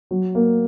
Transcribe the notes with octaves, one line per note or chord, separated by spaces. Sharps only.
F#3
A#3